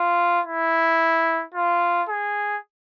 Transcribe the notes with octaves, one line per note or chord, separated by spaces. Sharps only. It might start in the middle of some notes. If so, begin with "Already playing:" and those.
Already playing: F4
E4
F4
G#4